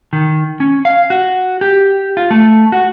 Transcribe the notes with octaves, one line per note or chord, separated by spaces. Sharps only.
D#3
C#4
F5
F#4
G4
F4
A3
F#4